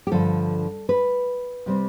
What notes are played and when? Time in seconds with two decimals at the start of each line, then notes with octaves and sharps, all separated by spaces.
0.07 G4
0.11 G2 D3 F3 A4
0.89 B4
1.66 C3 G3 C4